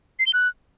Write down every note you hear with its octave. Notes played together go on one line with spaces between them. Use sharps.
C7
G7
F#6